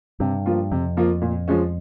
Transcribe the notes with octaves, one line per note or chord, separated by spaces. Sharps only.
G2 C3
F3 A#3 F4
F2 C3
F3 A#3 F4
A#2
F3 G#3 C#4